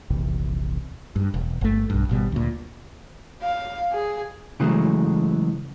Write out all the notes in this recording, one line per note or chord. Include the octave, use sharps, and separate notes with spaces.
D#1 A#1 E2 C3
G2
E1
G1 A3
B1 G2
G#1 B2 G3
D2 A#2
F5
G#4
C#3 E3 F#3 G#3 A3